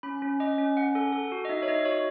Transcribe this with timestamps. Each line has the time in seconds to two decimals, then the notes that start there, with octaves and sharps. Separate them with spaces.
0.03 C#4 B5
0.22 C#4
0.40 C#4 D#5
0.58 C#4
0.77 C#4 F#5
0.95 A4
1.13 A4
1.32 F#4
1.45 D#5
1.49 D#4 E5
1.63 C#5
1.68 D#4 D#5
1.85 F#4 C#5